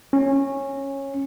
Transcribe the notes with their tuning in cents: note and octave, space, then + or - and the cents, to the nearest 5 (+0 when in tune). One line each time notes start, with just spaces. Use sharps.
C#4 -15